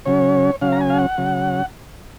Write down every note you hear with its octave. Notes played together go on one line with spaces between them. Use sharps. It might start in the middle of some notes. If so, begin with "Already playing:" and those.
C#3 F#3 C#4 C#5
C#3 F#3 C#4 F5
A#5
G#5
F5
F#5
C#3 F#3